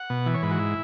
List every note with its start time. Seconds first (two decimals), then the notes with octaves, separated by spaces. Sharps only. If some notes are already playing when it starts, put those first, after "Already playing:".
Already playing: F#5
0.10 B2
0.26 E3
0.34 C#5
0.42 G#2 B4
0.51 F#4
0.59 E4